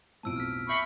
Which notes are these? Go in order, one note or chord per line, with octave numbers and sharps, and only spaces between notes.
B1 F2 A2 A5 E6 D7
F6 B6
E5 B5 C#6 G6